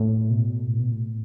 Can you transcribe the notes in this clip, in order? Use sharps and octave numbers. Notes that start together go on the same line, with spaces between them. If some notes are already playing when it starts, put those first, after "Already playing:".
Already playing: A2
B2
A2
B2
A2